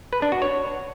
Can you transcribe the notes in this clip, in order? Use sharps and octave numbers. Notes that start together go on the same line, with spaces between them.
B4
D4
F#4
C#5